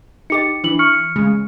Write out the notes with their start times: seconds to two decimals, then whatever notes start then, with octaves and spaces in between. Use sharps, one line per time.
0.30 D#4 G4 D6 A6 C#7
0.64 E3 D4 F#7
0.79 C#6 F6 C#7
1.16 C#3 G#3